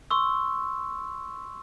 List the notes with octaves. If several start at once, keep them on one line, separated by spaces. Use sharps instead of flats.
C6 C#6 E6